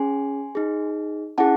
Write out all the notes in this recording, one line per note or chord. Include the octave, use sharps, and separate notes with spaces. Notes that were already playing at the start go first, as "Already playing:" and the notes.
Already playing: C#4 G#4 G#5 C6
D#4 G#4
C#4 E4 G#4 F#5 A5